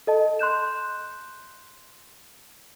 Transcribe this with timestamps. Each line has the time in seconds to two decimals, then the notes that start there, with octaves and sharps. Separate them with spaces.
0.07 A4 D#5 A5
0.39 C6 F#6 G6 E7